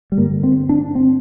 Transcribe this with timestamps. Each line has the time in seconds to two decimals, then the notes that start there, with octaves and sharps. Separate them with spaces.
0.12 G3
0.17 G2 D3 A#3
0.43 C4
0.69 D4
0.95 C4